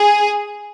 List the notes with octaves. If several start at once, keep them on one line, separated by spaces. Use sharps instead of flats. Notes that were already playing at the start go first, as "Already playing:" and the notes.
Already playing: G#4